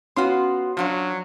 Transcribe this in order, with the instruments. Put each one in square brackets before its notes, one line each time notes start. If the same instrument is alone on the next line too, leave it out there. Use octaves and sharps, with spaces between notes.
[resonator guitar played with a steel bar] B3 F4 F#4 [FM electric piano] C#4 C6
[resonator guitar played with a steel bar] F3 D4 C5 [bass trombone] F#3